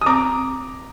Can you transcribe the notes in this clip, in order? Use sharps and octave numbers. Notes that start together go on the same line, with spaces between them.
D#6
C4 A#5 D6